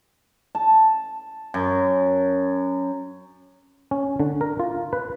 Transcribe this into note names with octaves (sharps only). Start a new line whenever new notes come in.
A5
F#2
C#4
D3
A#4
F4
B4